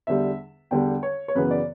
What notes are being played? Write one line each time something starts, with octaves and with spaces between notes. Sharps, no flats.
E2 D3 G3 E5
E2 D3 G3 G5
C#5
C#5
F#2 C#3 E3 B3 B4
D5